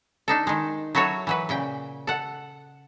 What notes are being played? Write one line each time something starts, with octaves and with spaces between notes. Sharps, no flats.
D4 D#4 A4
D#3 G#3
F#3 E4 F#4 A4 C#5
E3 F#3 B4
A#2 C#3 G5
A4 F#5